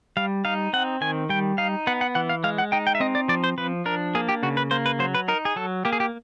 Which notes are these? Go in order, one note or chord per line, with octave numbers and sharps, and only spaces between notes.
G3 F5
D#4 F5
C4 F#5
D#3 G#5
G3 G5
D#4 F5
B3 F#5
F#5
E3 F#5
F5
G#3 F5
F#5
D#4 G5
G5
E5
C4 D#5
D5
F3 D5
C5
F3 B4
D4 A#4
A#3 G#4
G4
C#3 F#4
B4
A#3 C5
B4
F#3 C5
B4
D#4 A#4
G#4
F#3 A4
A#3 G4
G#4
G4